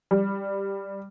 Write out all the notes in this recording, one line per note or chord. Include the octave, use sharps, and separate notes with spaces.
G3